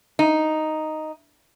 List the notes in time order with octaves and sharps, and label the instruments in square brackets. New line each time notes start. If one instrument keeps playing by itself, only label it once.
[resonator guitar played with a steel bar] D#4